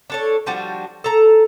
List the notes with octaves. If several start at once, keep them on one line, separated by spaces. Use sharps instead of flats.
D4 A4 C#5
F3 G3 D4 F#4
A4 A#5